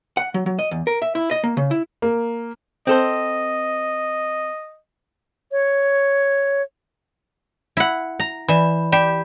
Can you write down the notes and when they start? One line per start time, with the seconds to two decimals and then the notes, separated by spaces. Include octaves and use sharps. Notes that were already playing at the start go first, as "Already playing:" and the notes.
0.17 F#5
0.34 F#3
0.46 F#3
0.59 D#5
0.71 E2
0.87 A#4
1.02 E5
1.15 E4
1.31 D#5
1.44 A#3
1.57 C#3
1.71 E4
2.02 A#3
2.87 C4 A4 C5 D#5
5.52 C#5
7.77 E4 F#5
8.20 A#5
8.48 E3 D5 B5
8.93 G4 D5 B5